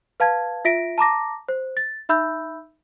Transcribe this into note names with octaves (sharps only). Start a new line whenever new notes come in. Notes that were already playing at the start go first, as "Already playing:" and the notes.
B4 F5 A5 G#6
F4 E5 A#6 B6 D7
A5 A#5 D6 A#6
C5
A6
D#4 E5 B5 E6 G6